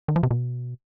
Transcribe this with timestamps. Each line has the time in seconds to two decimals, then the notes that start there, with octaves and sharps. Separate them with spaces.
0.08 D#3
0.16 F3
0.23 C3
0.31 B2